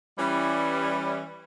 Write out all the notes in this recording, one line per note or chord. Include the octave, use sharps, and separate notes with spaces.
E3 G3 C#4